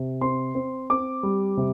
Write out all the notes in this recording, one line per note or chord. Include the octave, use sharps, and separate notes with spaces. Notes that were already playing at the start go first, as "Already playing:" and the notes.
Already playing: C3
C4 C6
C4
C4 D6
G3
C3